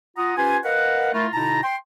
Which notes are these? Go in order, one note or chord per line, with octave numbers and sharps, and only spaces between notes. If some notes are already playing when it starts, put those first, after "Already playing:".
F4 F#5 A#5 D#6
C#4 F4 G4 B4 C5 G#5
A#4 B4 D#5 F5 F#5
A3 E4 F4 A#4
B2 D3 D#4 E4 A5 A#5
G5 C6